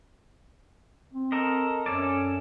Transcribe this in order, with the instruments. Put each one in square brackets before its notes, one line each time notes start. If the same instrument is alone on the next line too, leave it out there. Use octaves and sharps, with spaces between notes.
[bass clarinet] C4
[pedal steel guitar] A4 A#4 D#5
[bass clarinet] F#2 [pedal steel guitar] C#4 A4 D5